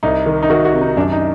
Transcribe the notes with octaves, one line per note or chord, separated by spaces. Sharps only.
C2 D#4
D#3
D#4
D#3 F#4
F#4
C3
D#4
F#2 D4
D#4